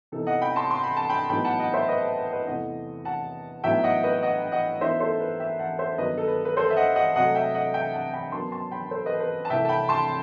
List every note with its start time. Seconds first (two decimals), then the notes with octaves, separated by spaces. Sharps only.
0.12 C3 E3 B3 D#4 A4
0.27 D#5 F#5
0.41 G5 B5
0.56 A5 C6
0.71 C6
0.83 B5
0.97 A5
1.09 G5 B5
1.30 A2 F#3 B3 D#4 G5 B5
1.44 F#5 A5
1.59 D#5 F#5
1.74 C5 E5
1.88 B4 D#5
2.03 B4
2.17 B4
2.32 B4 D#5
2.47 E2 C3 E3 A3 D#5 F#5
3.05 F#5 A5
3.64 A2 F#3 B3 D#4 E5 G5
3.84 D#5 F#5
4.03 B4 D#5
4.23 D#5 F#5
4.52 D#5 F#5
4.81 F#2 E3 B3 D#4 C5 E5
5.00 A4 C5
5.20 B4
5.40 E5 G5
5.59 F#5 A5
5.79 C5 E5
5.98 G2 D#3 F#3 B3 D#4 B4 D#5
6.18 A4
6.28 B4
6.45 B4
6.57 A4 C5
6.70 E5
6.77 D#5 F#5
6.95 D#5 F#5
7.16 C3 F#3 A3 D#5 F#5
7.35 E5 G5
7.55 D#5 F#5
7.74 E5 G5
7.93 F#5 A5
8.13 G5 B5
8.32 F#2 F#3 B3 A5 C6
8.52 A5 C6
8.71 G5 B5
8.91 A4 C5
9.06 B4 D#5
9.20 B4
9.45 A5
9.50 C2 C3 E3 A3 E5 G5
9.65 A5
9.69 G5 B5
9.89 A5 C6